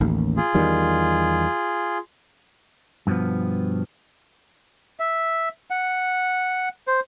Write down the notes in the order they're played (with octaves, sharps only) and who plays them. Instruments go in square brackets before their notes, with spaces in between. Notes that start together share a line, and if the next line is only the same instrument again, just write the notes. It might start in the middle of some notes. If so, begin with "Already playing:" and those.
[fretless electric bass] A1 D#2
[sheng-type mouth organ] F4 G#4
[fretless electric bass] E2 D#3 G3
[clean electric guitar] G2 B2 D3 F3 B3
[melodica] E5
F#5
C5